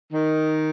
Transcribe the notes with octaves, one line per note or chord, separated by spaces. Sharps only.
D#3